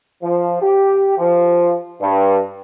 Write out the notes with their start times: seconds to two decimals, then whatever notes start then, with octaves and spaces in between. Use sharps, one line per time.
0.22 F3
0.61 G4
1.17 F3
2.00 G2